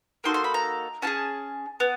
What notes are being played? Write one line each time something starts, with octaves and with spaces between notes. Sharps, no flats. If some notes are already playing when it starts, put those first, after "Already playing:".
A#3 D#4 F#4 A4 C6
C6
B5
A#5
C#4 F4 G#4 A5
B3